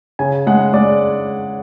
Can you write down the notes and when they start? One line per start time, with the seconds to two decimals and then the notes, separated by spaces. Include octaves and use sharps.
0.19 C#3 G#5
0.47 G#3 F#5
0.73 G#3 D5